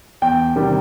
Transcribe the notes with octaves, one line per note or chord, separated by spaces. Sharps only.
E2 G5
C3 D#3 G3